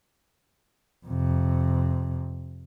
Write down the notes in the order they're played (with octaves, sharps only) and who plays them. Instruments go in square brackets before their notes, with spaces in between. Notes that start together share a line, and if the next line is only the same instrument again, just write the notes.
[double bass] F2 C3